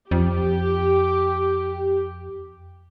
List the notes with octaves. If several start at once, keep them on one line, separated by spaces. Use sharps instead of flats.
F2 G4